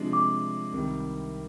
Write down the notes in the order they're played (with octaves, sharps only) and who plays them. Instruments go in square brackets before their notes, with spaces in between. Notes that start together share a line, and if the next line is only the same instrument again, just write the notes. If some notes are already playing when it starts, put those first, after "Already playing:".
Already playing: [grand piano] C3 F3 G#3 D4
[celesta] D6
[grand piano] C2 C3 D#3 G3